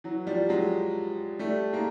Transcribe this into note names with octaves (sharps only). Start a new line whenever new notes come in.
E3 F#3
F3 G3
F#3 G#3
G3 A3
G#3 A#3